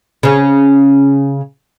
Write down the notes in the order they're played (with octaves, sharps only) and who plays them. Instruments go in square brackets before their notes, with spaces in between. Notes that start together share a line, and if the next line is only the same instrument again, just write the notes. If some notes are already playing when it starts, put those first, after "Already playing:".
[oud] C#3 C#4